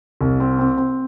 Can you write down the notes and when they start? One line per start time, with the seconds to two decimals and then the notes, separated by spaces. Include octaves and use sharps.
0.21 C2
0.40 C4
0.59 C4
0.77 C4